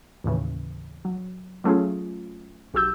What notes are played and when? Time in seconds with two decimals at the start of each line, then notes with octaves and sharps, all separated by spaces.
0.24 D#2 A2 C#3 E3
1.05 F#3
1.64 F#3 A3 C#4 F4 G#4
2.74 B1 F#4 G4 E6 G6